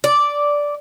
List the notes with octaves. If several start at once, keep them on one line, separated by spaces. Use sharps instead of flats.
D5